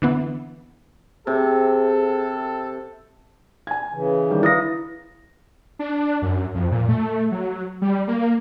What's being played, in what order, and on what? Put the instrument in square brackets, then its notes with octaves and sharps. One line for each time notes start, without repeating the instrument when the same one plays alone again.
[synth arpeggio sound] D3 E3 B3
[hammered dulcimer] C3 [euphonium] G#4 [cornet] A4
[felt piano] G#5 G#6
[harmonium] C#3 E3
[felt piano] D#3 G3 D4
[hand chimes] E4 D#6 A#6 [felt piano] B4 F5
[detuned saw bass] D4
F#2
F2
A#2
A3
F#3
G3
A#3